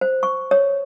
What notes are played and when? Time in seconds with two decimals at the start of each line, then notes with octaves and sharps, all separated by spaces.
0.01 C5
0.23 C#6
0.51 C#5